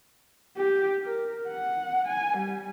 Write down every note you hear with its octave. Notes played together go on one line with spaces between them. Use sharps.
G4
A#4
F#5
G#5
G3